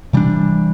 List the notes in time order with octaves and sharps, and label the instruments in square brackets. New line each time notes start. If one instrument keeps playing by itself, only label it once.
[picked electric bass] C3 E3 G3 D4